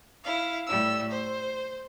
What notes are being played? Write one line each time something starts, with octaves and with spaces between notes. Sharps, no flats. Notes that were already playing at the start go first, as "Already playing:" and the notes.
E4 F5
A2 G3 E6
C5